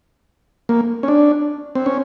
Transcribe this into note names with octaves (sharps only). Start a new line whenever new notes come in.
A#3
C#4
D4
C4
C#4